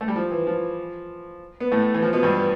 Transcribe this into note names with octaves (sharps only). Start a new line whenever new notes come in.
A3
G3
F3
E3
F3
B3
A2 A3
E3
F3
B2 B3
G2 G3